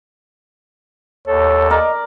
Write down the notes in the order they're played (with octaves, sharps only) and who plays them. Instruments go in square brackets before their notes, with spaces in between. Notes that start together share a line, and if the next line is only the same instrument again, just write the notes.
[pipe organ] D#2 A4 [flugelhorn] C#5
[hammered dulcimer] A#4 D5 [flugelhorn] D#5